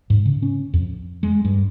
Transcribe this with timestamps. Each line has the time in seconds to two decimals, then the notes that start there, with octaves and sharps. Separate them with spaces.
0.10 G#2
0.26 C#3
0.43 C#4
0.74 F2
1.23 G#3
1.45 G2